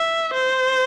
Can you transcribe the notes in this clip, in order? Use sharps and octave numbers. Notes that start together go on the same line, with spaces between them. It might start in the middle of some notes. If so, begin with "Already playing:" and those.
Already playing: E5
C5